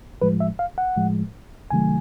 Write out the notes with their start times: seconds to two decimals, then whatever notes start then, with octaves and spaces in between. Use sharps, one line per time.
0.22 A2 F3 G#3 B4
0.40 E5
0.59 F5
0.78 F#5
0.96 A2 F3 G#3
1.70 C#2 C3 D#3 F#3 A3 G#5